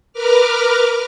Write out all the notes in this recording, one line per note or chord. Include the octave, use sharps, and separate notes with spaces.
A#4 B4 D6 F6